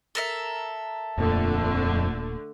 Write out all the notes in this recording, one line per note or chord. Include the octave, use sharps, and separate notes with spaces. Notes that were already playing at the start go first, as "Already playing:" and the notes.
A4 A#4 E5
D#1 F2 A#2 D3 A3